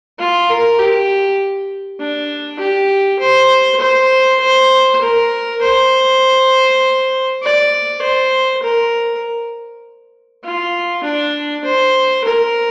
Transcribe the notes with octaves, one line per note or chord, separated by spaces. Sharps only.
F4
A#4
G4
D4
G4
C5
C5
C5
A#4
C5
D5
C5
A#4
F4
D4
C5
A#4